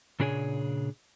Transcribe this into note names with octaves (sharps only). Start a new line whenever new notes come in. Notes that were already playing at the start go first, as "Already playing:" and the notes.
A#2 C#3 D4 G#4 C#5 G#5